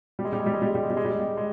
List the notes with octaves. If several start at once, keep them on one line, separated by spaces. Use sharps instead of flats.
G3
G#3
G3
G#3
G3
G#3
G3
G#3
G3
G#3
G3
G#3
G3
G#3
G3
G#3